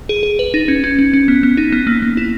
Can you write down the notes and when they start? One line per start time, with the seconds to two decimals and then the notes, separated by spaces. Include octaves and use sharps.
0.09 G#4
0.23 G#4
0.39 B4
0.54 D#4
0.68 C#4
0.84 C#4
0.99 C#4
1.13 C#4
1.28 B3
1.43 B3
1.57 D#4
1.72 B3
1.87 A#3
2.02 A#3
2.17 E4